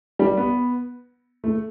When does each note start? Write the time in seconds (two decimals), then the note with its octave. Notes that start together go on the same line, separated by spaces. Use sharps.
0.19 G3
0.37 B3
1.44 A3